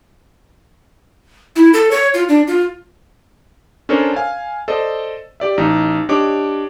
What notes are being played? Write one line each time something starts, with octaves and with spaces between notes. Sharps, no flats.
E4
A4
C#5
F4
D4
F4
C#4 D4 A4 A#4 C5 C#5
F5 G#5
A4 C5 D5 D#5
G4 D5 E5
A1 D#4
D4 G4 C#5 D#5 D6